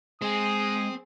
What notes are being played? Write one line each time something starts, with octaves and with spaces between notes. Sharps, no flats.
G#3 C4 G#4 D#6